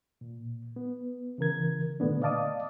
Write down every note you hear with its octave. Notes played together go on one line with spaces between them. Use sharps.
A#2
B3
C#3 E3 A#4 G#6
A#2 D3 A3 B3 D4
D5 D#5 F5 A5 D6 D#6